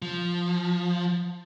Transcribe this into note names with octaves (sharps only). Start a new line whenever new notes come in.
F3